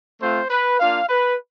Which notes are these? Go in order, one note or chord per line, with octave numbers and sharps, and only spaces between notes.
A3 C4 F4 C5
B4
A#3 D4 F4 F5
B4